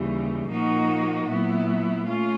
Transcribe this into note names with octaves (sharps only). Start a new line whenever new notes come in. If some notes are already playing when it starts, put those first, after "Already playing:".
Already playing: D#2 C#3 E3 G3
A#2 F3 A#3 D#4 F#4
A#2 F#3 B3 E4
A3 C#4 F4